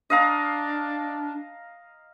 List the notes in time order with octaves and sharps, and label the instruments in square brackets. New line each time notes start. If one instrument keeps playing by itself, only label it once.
[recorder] D4 [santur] D#5 F5 A#5